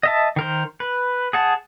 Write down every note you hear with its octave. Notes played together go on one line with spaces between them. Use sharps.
D#5 E5 A5
D#3 A#4 C5
B4
G#4 F#5 A5